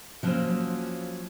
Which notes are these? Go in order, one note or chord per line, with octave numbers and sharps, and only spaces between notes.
F3 F#3 A#3 C#4 F#4 C5